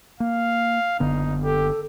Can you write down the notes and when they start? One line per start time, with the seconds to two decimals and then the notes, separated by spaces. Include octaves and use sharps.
0.20 A#3 F5
1.00 F#1 D3 B3 D#4
1.43 G4 A4